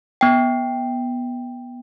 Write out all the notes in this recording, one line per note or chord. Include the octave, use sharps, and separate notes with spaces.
B3 G5